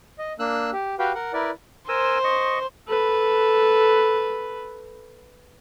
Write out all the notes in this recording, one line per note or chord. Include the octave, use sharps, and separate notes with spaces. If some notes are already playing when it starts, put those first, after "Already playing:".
D#5
A#3 D4 E6 F#6
G4
F#4 G4 B4 F5 G5
A#4 F#5
E4 A#4 B4 D5
A#4 C5 G#5 E6
D#5 C#6
A4 B4